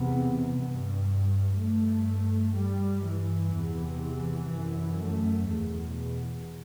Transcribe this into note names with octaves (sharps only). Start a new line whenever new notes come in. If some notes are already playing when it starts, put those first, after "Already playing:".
Already playing: E2 C3 B3
G2
G2 A3
G2 G3
E3
E2 C3
E3
F#2
A3
E2 B2